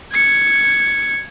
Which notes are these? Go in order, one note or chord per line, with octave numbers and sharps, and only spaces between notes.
G#6 C#7